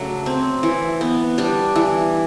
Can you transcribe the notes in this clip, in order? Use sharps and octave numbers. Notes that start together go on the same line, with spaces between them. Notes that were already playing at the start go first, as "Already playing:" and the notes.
Already playing: C#3 F#3 A3 D4
C4
E3
B3
G3 D4
E3